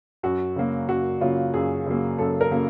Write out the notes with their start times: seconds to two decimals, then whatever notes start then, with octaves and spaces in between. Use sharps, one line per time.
0.23 F#2 F#4
0.56 C#3 F#3 A#3
0.89 F#2 F#4
1.21 C#3 F#3 A#3 F4
1.54 F#2 G#4
1.86 C#3 F#3 A#3
2.18 F#2 A4
2.41 A#4
2.51 C#3 F#3 A#3